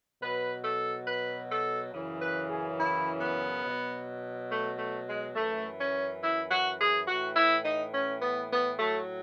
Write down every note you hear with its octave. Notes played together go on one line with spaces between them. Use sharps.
B2 F#3 B4
A4
B4
A4
F#2 C#3 E3
B4
G#4
E4
B3
B2 F#3
A3
A3
G#3
F#2 E3 A3
C#4
E4
F#4
G#4
A2 E3 F#4
E4
D#4
C#4
B3
B3
A2 F#3 A3